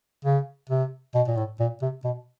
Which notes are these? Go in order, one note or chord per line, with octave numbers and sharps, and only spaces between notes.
C#3
C3
B2
A#2
A2
A#2
C3
B2